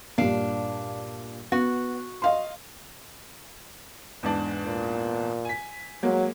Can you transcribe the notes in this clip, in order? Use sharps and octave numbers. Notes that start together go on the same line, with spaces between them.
G2 A#2 D4 F5
B3 F#4
D#5 F5 C6
E2 G#2 D4
A#2
G#5 B6
F#3 G#3 A#3